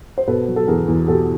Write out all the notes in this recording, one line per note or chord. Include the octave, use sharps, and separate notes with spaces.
C5
B2 A4 B4
F#3
A4
E2 G#4 A#4
E2
B2 G4 A4